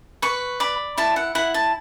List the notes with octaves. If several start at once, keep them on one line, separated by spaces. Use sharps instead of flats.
B4 C#6
D5 B5
E4 A5
F#5
E4 F#5
A5